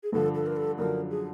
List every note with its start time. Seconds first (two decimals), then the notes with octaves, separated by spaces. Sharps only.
0.03 G#4
0.12 G2 D3 F3 A4
0.35 A4
0.47 A#4
0.56 A4
0.78 F#2 D3 F3 A#4
1.11 G#4